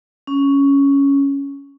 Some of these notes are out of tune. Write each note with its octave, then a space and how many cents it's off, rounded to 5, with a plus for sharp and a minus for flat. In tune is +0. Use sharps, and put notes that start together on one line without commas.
C#4 +5